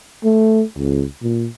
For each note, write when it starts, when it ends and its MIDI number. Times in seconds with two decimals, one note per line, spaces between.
0.24 0.63 57
0.77 1.04 37
1.22 1.48 46